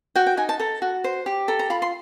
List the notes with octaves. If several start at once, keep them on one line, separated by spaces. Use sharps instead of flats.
F#4 G5
G5
D#4 G#5
A5
A4 A#5
F#4
C5
G4
A4 A#5
A#5
F4 B5
C6